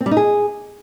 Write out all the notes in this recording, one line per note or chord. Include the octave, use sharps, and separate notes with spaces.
C4
G3
D#4
G#4